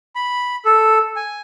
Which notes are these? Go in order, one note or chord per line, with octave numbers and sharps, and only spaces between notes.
B5
A4
G#5